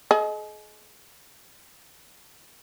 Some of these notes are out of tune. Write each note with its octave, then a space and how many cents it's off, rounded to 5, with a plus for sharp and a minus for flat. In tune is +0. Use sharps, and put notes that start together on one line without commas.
G#4 +40 D#5 +0